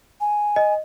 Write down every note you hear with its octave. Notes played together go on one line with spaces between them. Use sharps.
G#5
D#5